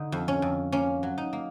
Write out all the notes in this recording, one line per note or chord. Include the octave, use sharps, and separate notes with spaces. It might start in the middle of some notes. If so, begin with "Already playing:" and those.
Already playing: D3 D#4
F2
C#4
F2
A#3 C#4
F#3
D#4
A#3